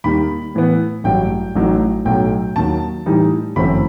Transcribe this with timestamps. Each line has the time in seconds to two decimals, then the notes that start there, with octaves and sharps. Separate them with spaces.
0.04 D#2 D#3 G3 B5
0.55 A2 E3 B3
1.04 A1 G2 F#3 A3 G5
1.56 A1 A2 F#3 A3 D#4
2.05 B1 A2 F#3 G5
2.56 D#2 D#3 F#3 A5
3.06 A2 E3 G3 D#4
3.56 G1 F#2 E3 A3 C4 B5